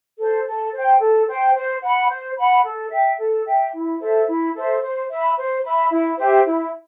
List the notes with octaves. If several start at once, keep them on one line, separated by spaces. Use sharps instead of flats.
A4 C5
A4
C5 G5
A4
C5 G5
C5
F#5 B5
C5
F#5 B5
A4
E5 G5
A4
E5 G5
E4
A4 C5 E5
E4
A4 C5 E5
C5
E5 B5
C5
E5 B5
E4
G4 C5 E5
E4